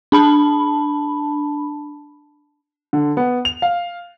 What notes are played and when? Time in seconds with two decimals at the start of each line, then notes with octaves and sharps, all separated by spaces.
0.12 D4 A5 B5
2.93 D3
3.17 B3
3.45 F7
3.62 F5